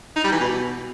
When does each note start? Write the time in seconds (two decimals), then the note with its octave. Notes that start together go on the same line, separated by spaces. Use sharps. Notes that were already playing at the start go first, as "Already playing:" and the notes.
0.16 D#4
0.24 G3
0.32 E3
0.40 B2